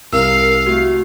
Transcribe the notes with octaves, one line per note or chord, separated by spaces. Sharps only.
C2 A#4 F5 E6
A3 F#4